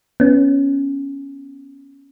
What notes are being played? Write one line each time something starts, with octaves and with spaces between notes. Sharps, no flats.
B3 C#4